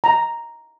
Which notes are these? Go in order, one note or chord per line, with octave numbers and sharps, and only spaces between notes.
A#5